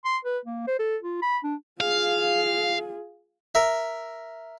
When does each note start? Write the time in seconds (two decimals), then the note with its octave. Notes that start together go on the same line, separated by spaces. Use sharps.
0.05 C6
0.25 B4
0.46 A#3
0.68 C5
0.79 A4
1.03 F4
1.22 B5
1.44 D4
1.81 F4 G#4 F5
3.55 A#4 E5